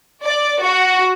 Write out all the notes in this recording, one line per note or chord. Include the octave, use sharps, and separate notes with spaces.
D5
F#4